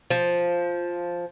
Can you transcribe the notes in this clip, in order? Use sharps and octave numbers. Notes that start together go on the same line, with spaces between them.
F3